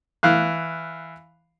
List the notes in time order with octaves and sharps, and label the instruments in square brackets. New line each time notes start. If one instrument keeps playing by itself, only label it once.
[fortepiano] E3 F5 F#6